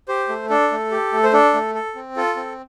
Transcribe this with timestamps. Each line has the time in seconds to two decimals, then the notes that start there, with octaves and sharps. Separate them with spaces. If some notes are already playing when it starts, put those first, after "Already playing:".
0.08 G4 C5
0.29 A3
0.50 D4 A4
0.71 A3
0.91 G4
1.13 A3
1.23 C5
1.33 D4 A4
1.54 A3
1.75 A4
1.96 C4
2.16 F4 A4
2.36 C4